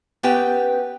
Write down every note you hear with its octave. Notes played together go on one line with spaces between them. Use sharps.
B3 C#4 G4 B4 D5 G5